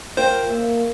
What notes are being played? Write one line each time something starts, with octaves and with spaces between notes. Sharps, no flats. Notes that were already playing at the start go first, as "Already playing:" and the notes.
F4 A#4 C5 G5
A#3 E5